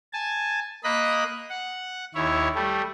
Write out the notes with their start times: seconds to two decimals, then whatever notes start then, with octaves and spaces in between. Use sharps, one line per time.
0.13 G#5 A5
0.84 A#3 D#5 B5 F#6
1.49 F#5
2.15 D#2 E4 C#5
2.55 G3 A3